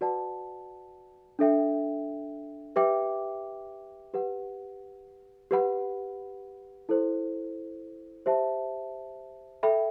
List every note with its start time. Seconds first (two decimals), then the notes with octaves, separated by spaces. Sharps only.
0.01 F#4 B4 D5 F#5 A5
1.39 D4 A4 E5 G5
2.76 G4 B4 E5 G5 D6
4.14 G4 B4 F#5
5.51 G4 B4 F#5 B5
6.89 E4 A4 C5
8.26 G4 C5 E5 A5
9.63 A4 E5 G5 B5